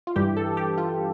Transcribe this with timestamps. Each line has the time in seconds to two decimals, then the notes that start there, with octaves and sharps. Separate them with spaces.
0.07 F4
0.16 G2 E3 G3 G4
0.37 A4
0.57 G4
0.78 F4